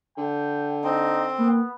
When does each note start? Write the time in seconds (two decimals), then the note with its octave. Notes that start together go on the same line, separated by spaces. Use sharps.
0.17 D3 G5
0.84 C4 D#4
1.39 A#3 B3